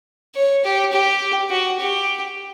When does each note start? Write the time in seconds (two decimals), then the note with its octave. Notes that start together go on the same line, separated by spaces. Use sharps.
0.35 C#5
0.64 G4
0.92 G4
1.50 F#4
1.79 G4